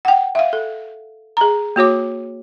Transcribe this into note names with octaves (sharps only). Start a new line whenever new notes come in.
F#5 G5
E5 F5
A4
G#4 A#5
A#3 F#4 C#5 D6